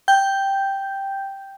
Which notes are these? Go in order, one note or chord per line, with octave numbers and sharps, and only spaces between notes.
G5 G6